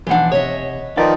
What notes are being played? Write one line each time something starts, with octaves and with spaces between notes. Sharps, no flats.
B1 E3 F3 D4 F#5
C3 C#5 D#5 E5
D#3 F3 D#4 B4 D5 F5